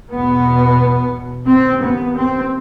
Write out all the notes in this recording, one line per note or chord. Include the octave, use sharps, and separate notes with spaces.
E2 B2 B3
D#2 C4
B3
C4